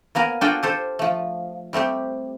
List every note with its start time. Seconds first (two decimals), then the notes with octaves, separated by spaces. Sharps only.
0.15 A#3 B3 A#4 G#5
0.41 D4 F4 F#4 A4 G5 G#5
0.63 G4 A4 C5
0.99 F3 A3
1.73 G3 A3 C4 G4